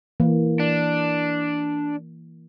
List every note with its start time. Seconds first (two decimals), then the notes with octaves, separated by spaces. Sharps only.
0.20 E3 A#3
0.60 D4